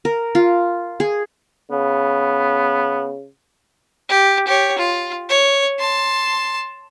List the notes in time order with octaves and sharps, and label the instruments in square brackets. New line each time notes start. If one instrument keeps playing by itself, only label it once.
[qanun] A#4
F4
G#4
[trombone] C#3 [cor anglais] B3
[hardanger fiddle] G4
G4 C#5
F4
C#5
A5 C6